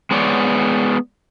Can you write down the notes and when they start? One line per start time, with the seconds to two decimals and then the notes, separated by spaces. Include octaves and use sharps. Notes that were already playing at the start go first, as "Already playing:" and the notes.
0.11 G#3 B3 C#5 D5